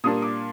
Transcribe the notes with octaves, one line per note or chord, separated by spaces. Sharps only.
A#2 G3 A#3 D4 D#6
D6